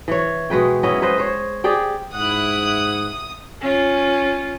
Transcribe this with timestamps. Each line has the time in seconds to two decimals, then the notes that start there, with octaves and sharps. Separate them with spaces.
0.08 E3 C#5
0.50 B2 G#3 B4 G5
0.83 B3 C#4 E4 D#5
1.02 B4 C5 D#5
1.18 C5 C#5
1.64 G4 G#4 D5 G5
2.14 G#2 E4 F#5 D#6 F#6
3.61 C#4 F4